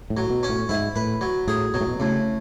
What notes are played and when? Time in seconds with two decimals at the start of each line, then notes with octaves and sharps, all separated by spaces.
0.10 A2
0.17 F#3
0.30 B2
0.43 C#4
0.49 A2
0.69 G#2 E4
0.96 A2 B4
1.21 F#3
1.47 A2 G#4
1.74 B2 F#3
1.81 A2
1.88 B2
2.00 A2 C#3